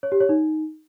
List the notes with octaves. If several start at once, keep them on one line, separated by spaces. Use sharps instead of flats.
C#5
G4
C#5
D#4